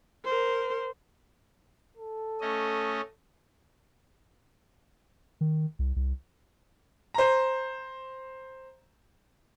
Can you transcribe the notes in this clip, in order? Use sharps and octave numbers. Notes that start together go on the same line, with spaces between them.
A#4 C5
A4
A3 C#4 D#5
D#3
C2
C2
C5 A#5